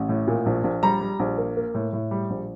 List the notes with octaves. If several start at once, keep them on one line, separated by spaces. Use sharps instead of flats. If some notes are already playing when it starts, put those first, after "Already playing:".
Already playing: A1
A2
A#2
A#1
A#1
G3 A#5
G3
A#1
A#3
A#3
A2
A2
G3
A#1